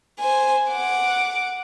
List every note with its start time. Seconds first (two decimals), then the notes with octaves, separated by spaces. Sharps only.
0.19 C5 G#5
0.70 F#5 D6